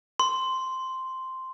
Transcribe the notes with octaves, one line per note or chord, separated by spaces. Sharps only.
C6